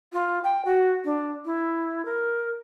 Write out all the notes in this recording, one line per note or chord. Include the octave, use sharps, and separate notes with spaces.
F4
G5
F#4
D4
E4
A#4